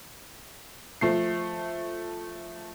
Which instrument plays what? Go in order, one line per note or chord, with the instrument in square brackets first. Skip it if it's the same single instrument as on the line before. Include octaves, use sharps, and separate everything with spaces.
[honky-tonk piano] F3 A3 C7